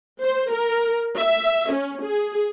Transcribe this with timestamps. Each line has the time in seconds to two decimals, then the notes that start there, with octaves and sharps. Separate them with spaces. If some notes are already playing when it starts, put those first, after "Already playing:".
0.22 C5
0.52 A#4
1.18 E5
1.72 C#4
2.04 G#4